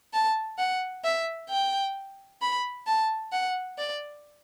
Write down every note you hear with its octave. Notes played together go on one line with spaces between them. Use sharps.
A5
F#5
E5
G5
B5
A5
F#5
D5